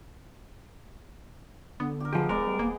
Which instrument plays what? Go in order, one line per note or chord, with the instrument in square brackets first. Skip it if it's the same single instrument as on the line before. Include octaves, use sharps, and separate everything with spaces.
[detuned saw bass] D3 [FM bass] B3
[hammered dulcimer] G4 A#4
[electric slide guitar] F3 G4 [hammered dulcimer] G#3 B3 G#4
[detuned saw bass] D1 [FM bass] G#3 [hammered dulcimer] B3 D5 [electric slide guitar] A#4
[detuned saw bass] G3
[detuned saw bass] D#1 [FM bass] A#3 [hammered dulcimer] D#5